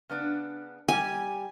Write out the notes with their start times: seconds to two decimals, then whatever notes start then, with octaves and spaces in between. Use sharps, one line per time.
0.10 C#3 B3 D4
0.88 G3 G4 G#5